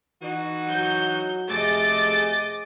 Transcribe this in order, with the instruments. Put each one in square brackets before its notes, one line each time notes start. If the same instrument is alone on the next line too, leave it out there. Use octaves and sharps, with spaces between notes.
[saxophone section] E3 D#4 F#4
[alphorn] F#3 [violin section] G6
[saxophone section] F2 C3 A3 [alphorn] G#4 [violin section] D#5 D6 A6